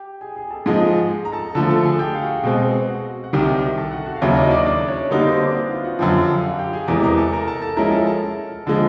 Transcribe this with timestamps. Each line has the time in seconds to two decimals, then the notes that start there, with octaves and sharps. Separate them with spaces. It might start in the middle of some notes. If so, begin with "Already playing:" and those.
Already playing: G4 G5
0.21 G#4 G#5
0.36 G#4 G#5
0.51 A4 A5
0.66 G#2 F3 G#3 G#4 G#5
1.25 A#5
1.32 A4 A5
1.55 D3 F3 A3 A4 A5
1.70 A4 A5
1.84 G#4 G#5
1.99 G4 G5
2.15 F5
2.21 F#4 F#5
2.44 B2 G#3 C4
2.88 F#4 F#5
3.24 F#5
3.33 C2 C3 D#3 G4 G5
3.78 A4 A5
3.91 F#4 F#5
4.06 F#4 F#5
4.16 F5
4.21 D#2 C#3 F#3 E4 E5
4.30 D5
4.37 D#4 D#5
4.51 D4 D5
4.66 D4 D5
4.88 C#4 C#5
5.10 D3 G3 A#3 B3 D#4 F#4 B4
5.25 C4 C5
5.39 D4 D5
5.54 E4 E5
5.70 F4 F5
5.84 F#4 F#5
5.99 F#2 D3 F3 G4 G5
6.34 F5
6.44 F#4 F#5
6.58 G4 G5
6.73 G#4 G#5
6.88 E2 C3 E3 G#3 A#4 A#5
7.03 A#4 A#5
7.18 A4 A5
7.33 A#4 A#5
7.48 A4 A5
7.62 A4 A5
7.77 F3 G#3 C#4 E4 A#4 A#5
7.91 A4 A5
8.07 A4 A5
8.65 D3 F3 G#3 A4 A5